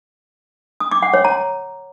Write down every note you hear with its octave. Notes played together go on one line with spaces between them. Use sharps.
D#6
D6
F#5
C#5
A#5